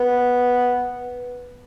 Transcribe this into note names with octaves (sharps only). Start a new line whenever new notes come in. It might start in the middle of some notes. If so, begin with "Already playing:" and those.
Already playing: B3